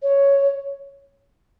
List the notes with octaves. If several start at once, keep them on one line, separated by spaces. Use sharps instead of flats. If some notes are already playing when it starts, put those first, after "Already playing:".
C#5